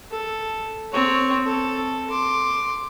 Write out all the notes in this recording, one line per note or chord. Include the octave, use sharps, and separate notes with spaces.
A4
C4 C#5
A4
C6 D6